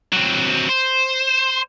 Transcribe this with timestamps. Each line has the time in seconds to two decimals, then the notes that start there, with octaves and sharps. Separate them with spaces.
0.13 F#3 C4
0.69 C5